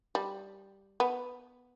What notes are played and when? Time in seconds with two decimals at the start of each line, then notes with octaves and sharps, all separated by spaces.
0.15 G3
1.00 B3